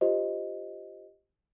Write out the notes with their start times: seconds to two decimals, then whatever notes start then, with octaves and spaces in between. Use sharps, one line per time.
0.01 F4 G4 C5 D#5